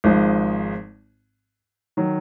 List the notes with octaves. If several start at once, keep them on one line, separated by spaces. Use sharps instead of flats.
G#1 G#2 F3
D#3 F#3